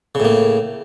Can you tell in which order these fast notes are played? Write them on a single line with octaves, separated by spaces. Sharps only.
C#3 A2 A#3